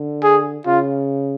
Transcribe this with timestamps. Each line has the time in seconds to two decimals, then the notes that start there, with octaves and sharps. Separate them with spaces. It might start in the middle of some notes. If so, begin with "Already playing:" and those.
Already playing: D3
0.23 G#4
0.66 C#3 F4